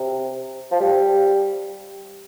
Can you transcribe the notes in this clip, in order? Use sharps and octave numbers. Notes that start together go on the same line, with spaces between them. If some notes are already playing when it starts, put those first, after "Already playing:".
Already playing: C3
F3
G3